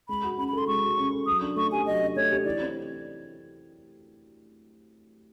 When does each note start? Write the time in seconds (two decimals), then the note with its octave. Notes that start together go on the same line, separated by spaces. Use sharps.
0.09 G#3 B5
0.24 F#4
0.38 C#4 B5
0.48 B5
0.53 A4 C6
0.67 G#3 C#6
0.83 F#4
0.98 C#4
1.12 A4
1.27 F#3 D#6
1.41 D4
1.56 A3 C#6
1.72 G4 G#5
1.86 F#3 D#5
2.01 D4
2.16 A3 C#5
2.31 G4
2.45 E3 D5
2.61 C4